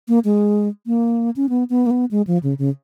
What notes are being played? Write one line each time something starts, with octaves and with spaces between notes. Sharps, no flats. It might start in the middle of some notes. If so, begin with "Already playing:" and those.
A#3
G#3
A#3
C#4
B3
B3
A#3
B3
G#3
F3
C#3
C#3